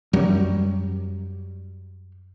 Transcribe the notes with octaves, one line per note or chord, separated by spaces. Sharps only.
F#2 F#3 G3